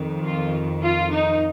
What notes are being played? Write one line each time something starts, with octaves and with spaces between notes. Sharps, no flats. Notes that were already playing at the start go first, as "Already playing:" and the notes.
Already playing: F2 D#3
F4
F4
D#4